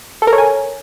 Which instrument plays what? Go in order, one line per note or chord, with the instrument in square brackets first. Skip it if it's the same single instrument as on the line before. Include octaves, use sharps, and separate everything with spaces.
[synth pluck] A4
A#4
C#5
G#5